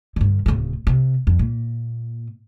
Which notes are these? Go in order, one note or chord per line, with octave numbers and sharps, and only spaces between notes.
G2 D3
D1 C#3
C3
F2
A#2